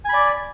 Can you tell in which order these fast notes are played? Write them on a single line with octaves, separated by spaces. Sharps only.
G#5 B5 D5